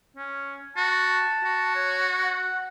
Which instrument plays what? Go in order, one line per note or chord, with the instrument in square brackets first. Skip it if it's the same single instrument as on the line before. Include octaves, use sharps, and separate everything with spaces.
[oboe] C#4
[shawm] F#4 [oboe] A5
[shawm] F#4
[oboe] C#5
F#5